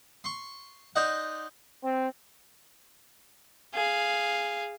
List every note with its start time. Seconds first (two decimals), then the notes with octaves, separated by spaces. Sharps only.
0.24 C6 C#6
0.96 D#4 C5 D5 D#5 F#5
1.83 C4
3.74 G#4 F5